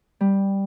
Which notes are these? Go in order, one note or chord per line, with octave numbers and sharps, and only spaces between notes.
G3